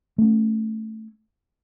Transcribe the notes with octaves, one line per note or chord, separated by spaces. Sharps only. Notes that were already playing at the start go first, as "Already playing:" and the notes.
A3 C#4